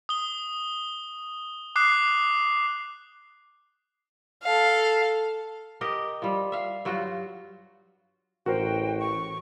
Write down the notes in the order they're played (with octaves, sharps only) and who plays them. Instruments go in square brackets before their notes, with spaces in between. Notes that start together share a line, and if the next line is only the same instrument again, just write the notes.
[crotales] D#6 G7
D6 D#6 F#6 C7
[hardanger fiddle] A4 F5
[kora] G4 A#4 D#5
F3 G3
E5 F5
G2 F#3 F4 F#4
[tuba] A1 [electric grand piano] F#4 A#4 C5 [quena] G5
[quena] C#6